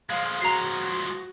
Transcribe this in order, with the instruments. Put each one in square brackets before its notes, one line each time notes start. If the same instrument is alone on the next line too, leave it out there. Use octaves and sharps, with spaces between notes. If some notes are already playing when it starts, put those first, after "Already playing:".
[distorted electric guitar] F3 G#3 [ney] F5
[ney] F#4 [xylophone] A#5 C7